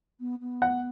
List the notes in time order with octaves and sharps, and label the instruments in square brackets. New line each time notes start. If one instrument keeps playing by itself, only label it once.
[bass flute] B3
B3
[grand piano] F#5